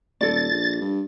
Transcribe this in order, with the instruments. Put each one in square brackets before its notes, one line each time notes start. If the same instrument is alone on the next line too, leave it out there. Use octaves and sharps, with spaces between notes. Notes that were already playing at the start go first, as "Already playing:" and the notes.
[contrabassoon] D#1 [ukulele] A4 D5 [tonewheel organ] A6
[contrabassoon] A#1
G2